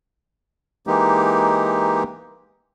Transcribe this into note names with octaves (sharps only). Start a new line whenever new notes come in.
E3 G#3 A#3 D#4 G4